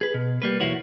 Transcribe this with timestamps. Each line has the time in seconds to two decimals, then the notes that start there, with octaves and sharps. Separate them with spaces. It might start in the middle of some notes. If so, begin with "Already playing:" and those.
0.01 G#4 B4
0.14 B2
0.42 G3 A#3 B4
0.60 B1 E2 A#3 E4 F#4 C#5